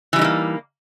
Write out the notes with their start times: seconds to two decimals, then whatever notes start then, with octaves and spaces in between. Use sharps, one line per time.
0.13 E3
0.16 G3
0.19 D#4
0.21 A3
0.24 A#3